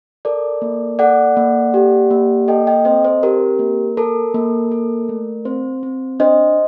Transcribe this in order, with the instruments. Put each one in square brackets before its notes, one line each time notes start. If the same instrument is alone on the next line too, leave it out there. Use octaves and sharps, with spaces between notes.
[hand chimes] A4 A#4 D5
A#3
A4 D5 F#5
A#3
G4
A#3
A4 D#5 G5
D#5 G5
C4 C5 D#5
C5
G4 A#4
A#3
A4 A#4
A#3
A4
A3
C4 C5
C4
D4 C5 D#5